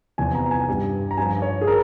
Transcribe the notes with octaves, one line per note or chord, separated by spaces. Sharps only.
E2 C3 F3 G#5
A#5
G#5
G2 G3
A#5
G2 F3 G#5
C#5
G#4
A#4